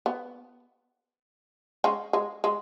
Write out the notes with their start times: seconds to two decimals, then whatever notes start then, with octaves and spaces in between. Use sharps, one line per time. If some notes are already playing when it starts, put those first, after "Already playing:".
0.06 B3
1.84 G#3 C#4
2.13 G#3
2.44 G#3